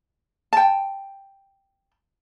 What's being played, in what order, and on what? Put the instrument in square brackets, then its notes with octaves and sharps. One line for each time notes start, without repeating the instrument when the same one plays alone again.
[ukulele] G5 A5